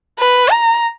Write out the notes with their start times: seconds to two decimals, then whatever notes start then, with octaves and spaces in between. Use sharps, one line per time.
0.19 B4
0.51 A#5